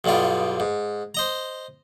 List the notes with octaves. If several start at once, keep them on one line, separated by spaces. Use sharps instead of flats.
B1 G2 B2 G3 F4
G#2
C5 D#5 A#5